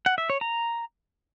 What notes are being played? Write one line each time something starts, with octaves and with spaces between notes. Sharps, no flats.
F#5
E5
C#5
A#5